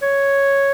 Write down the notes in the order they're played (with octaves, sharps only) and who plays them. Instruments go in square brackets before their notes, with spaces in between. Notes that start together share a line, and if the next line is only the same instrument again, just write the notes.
[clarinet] C#5